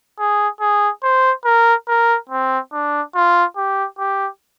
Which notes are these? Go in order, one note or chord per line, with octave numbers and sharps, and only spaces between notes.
G#4
G#4
C5
A#4
A#4
C4
D4
F4
G4
G4